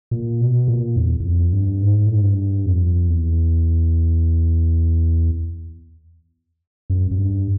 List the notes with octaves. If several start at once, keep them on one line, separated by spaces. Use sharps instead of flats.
A#2
B2
A#2
E2
E2
F2
G2
G#2
A2
G#2
G2
F2
E2
F#2
F#2
G2